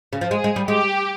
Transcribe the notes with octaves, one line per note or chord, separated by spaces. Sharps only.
C#3
F3
G#3 G#4
G#3
G3
G#3 G4